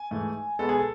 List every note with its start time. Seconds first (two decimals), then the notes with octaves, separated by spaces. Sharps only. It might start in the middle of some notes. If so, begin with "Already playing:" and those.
Already playing: G#5
0.11 G#2 E3 A3
0.59 B2 G#3 B3 A4
0.69 G#4
0.79 A4